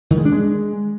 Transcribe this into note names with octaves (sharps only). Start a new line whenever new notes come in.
D#3
G#3
D4
G#3